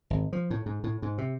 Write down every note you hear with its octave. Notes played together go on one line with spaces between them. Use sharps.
G#1
F3
A2
G#2
A2
G#2
C3